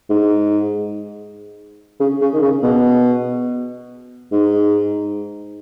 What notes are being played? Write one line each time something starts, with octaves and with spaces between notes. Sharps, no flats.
G#2
C#3
C#3
D#3
C#3
B2
G#2